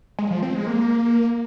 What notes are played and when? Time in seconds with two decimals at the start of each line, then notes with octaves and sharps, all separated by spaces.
0.19 G#3
0.31 F3
0.43 C4
0.55 G#3
0.67 A#3